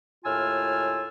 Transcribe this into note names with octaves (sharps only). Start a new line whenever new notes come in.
D#2 A2 F4 G#5 E6 F6